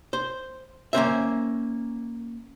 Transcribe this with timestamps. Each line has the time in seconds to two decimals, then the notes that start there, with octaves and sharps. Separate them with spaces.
0.13 C5
0.93 A#3 C#4 C5 E5